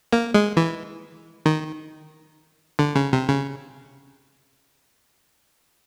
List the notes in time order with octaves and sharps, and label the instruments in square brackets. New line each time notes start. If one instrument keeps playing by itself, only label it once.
[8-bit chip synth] A#3
G#3
E3
D#3
D3
C#3
C3
C#3